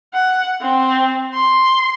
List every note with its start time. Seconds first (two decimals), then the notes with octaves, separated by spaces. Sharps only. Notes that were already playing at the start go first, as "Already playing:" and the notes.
0.14 F#5
0.62 C4
1.34 C6